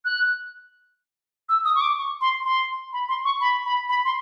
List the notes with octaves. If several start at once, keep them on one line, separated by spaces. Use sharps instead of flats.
F#6
E6
D#6
C#6
D6
C#6
C6
C6
B5
C6
C#6
B5
B5
B5
C6